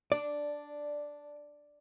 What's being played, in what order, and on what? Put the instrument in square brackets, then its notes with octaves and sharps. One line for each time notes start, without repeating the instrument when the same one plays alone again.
[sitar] D4 [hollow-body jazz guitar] D5